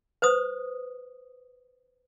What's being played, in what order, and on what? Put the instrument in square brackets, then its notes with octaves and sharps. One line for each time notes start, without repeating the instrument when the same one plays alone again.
[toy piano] B4 C5 D#6